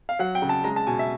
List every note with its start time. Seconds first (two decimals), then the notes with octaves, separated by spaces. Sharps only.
0.09 F5
0.19 F#3 F#5
0.35 G5
0.42 C#3
0.49 A5
0.64 G#3 A#5
0.76 A5
0.87 B2 G#5
0.99 E5